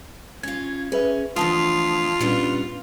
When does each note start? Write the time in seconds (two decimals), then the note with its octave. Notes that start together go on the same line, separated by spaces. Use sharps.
0.43 C#4 F4 G#6
0.92 C#4 G#4 B4 E5
1.36 D3 E3 F3 A3 F4 A5 D#6
2.20 A#2 G3 B3 C#4 D4